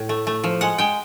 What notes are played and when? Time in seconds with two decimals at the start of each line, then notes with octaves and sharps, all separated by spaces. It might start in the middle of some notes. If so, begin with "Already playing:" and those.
Already playing: A2
0.09 A3
0.27 A3
0.44 F3
0.61 G#3 F#5
0.78 G#3 G5